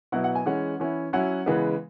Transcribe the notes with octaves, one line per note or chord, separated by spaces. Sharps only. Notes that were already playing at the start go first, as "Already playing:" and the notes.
B2 F#3 B3 E4 F#5
F#5
G#5
E3 G#3 C#4 F#5
E3 C#4 E4
F#3 C#4 E4 F#5
C#3 E3 G#3 B3